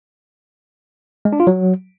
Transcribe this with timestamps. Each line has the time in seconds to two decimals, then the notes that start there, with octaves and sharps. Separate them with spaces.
1.25 G#3
1.33 D4
1.40 F4
1.47 F#3